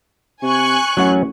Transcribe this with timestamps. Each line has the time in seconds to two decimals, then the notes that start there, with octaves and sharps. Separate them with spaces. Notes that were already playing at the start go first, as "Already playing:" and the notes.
0.43 C3 G#5 C#6 F#6
0.97 A1 F#3 C#4 F#5